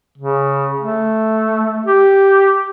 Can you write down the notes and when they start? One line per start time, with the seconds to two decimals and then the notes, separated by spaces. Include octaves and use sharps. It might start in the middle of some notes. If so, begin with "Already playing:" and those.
0.18 C#3
0.80 A3
1.86 G4